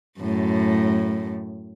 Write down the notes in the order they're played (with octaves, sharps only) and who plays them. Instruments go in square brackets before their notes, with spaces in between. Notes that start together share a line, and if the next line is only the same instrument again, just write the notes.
[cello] F#2 A2